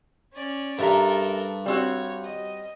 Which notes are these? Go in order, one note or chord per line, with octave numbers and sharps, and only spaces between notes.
C#4 D5
G2 A4 A#4 E5 A#5
G3 C4 F#4 C#5
D#5